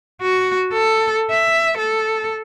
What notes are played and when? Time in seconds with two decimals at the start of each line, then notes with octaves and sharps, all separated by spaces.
0.22 F#4
0.73 A4
1.30 E5
1.78 A4